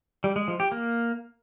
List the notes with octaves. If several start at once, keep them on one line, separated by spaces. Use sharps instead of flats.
G3
G#3
F3
G4
A#3